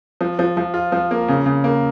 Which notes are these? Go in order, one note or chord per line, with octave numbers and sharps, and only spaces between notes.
F3
F3
F3
F4
F3
A#3
C#3
C#3
A#3